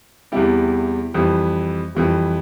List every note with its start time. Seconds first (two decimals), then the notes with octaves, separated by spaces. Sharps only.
0.32 E2 C3 G3 E4 G4
1.14 F2 E3 G3
1.95 F2 E3 G3